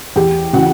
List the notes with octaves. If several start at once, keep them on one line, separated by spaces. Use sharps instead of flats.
E2 G4 G5
C#3 E3 F#4 F#5